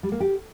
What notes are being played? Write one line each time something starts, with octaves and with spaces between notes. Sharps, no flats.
G3
A#3
G4